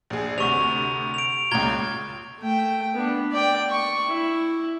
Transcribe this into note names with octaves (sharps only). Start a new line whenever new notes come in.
A#1 G#4
D2 C3 C#6 F7
D7 F7
C#2 A#2 A#5 G#6 G7
A3 G5
B3 D4
D5 G5
C#6
E4